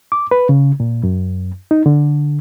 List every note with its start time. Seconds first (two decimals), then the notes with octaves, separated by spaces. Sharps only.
0.12 D6
0.31 B4
0.49 C#3
0.80 A#2
1.03 F#2
1.71 D#4
1.86 D3